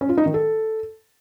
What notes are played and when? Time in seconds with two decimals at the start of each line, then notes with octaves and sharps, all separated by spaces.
0.01 C#4
0.09 F4
0.18 D#4
0.26 D#3
0.34 A4